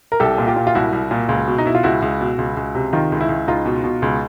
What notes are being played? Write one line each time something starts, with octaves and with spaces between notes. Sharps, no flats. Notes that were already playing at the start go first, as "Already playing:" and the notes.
A#4
C2 G4 A4
A#2
F4 G4
A#2
F4
C2 E4 F#4
C2
A#2
C#2
B2
D#4
B2 E4
F4
C#2 E4 F#4
C#2
B2
C#2
C#2
C3
D#3 D#4 F4
C#2
E4
C#2
C#2 D#4 F4
B2
B2
C#2